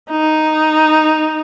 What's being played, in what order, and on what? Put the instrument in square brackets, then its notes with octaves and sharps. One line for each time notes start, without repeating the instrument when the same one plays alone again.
[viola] D#4